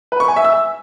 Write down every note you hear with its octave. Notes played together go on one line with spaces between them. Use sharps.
B4
C#6
G#5
E5
E6